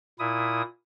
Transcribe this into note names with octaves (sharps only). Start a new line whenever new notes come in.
A#2 E4 D#6